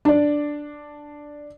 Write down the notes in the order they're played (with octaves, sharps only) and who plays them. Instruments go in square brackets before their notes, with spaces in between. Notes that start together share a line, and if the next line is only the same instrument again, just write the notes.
[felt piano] D4 D5